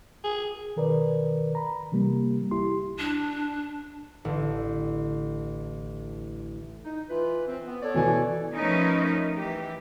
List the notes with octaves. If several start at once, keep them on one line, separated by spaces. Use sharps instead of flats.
G#4
B2 D#3 A#4 B4 D5
A#5 B5
C3 E3 G3 A#3
C2 E4 G4 C6
D4
A1 D3
D#4
E3 F4 B4
C4
B3
A4 C#5 D5
B2 E3 G#5
F3 A3 C#4 D#4 A#4 B4
E3 G4